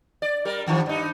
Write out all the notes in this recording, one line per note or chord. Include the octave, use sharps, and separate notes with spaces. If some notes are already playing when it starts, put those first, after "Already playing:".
D5
G3 A#4
G2 D#3 F3
G2 D#4